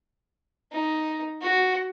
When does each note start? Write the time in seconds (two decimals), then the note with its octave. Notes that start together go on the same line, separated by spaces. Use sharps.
0.72 D#4
1.41 F#4